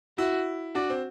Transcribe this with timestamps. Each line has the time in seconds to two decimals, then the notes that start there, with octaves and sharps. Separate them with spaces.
0.18 E4 F#4
0.75 D4 F#4
0.90 C4